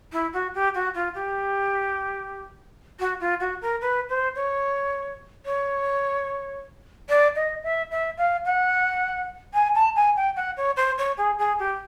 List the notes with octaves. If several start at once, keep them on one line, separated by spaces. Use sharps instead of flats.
E4
F#4
G4
F#4
F4
G4
F#4
F4
F#4
A#4
B4
C5
C#5
C#5
D5
D#5
E5
E5
F5
F#5
G#5
A5
G#5
G5
F#5
C#5
C5
C#5
G#4
G#4
G4